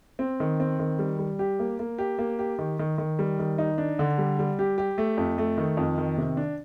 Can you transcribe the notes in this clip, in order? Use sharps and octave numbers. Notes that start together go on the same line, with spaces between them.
C4
D#3
C4
D#3
G3
G3
G4
A#3
A#3
G4
A#3
G4
D#3
D#3
D#3
G3
D#3
D#4
D4
D3
G3
G3
G4
G4
A3
F2
A3
D#3
F2
D#3
C3
D4